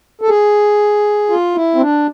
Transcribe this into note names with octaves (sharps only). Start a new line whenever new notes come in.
A4
G#4
F4
E4
C4
D4